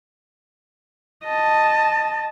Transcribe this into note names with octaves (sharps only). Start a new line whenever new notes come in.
D#5 A5